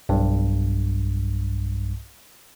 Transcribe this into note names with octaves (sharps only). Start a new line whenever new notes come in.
B1 G2